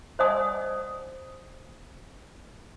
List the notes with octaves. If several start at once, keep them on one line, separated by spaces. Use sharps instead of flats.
C5 D5 D#5 F#5 G#5 D#6